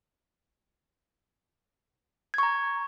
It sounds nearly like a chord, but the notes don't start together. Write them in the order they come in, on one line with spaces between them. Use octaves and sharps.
G#6 C#6 A#5